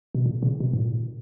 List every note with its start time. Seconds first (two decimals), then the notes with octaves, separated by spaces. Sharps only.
0.15 B2
0.26 A#2
0.43 C#3
0.60 B2
0.73 G#2
0.78 A#2